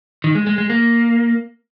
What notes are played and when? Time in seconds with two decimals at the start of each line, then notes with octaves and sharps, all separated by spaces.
0.24 D#3
0.35 G#3
0.47 G#3
0.58 G#3
0.70 A#3